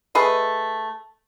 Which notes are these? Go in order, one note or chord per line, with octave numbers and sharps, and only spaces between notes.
A3 G#4 B4 D#5